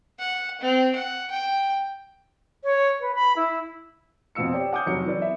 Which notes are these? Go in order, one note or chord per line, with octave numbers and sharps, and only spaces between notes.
F#5
C4
F#5
G5
C#5
B4
B5
E4
F2 B2 F4 E6 C#7
G4 C#5 D5 G5
F#5 G#5 D6 D#6 F6 G6
F1 F#3 C#5 C#7
E3 F#3 B4 D5
B3 E5